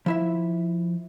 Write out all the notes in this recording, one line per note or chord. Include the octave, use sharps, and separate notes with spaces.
F3 E4 E5